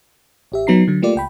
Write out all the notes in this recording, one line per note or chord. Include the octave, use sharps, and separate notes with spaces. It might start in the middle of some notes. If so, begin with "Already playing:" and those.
A1 G4 E5
F#3 B3 D#4 A#5 C7
D3 F#3
A3 A#3 F4 G4 D5
C#2 G5 B5